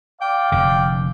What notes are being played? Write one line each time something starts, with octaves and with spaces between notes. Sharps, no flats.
D5 F5 G5
F1 F2 D3 G5